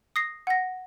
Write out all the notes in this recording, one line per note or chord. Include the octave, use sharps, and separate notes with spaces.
D#6 A#6 C7
F#5 A#6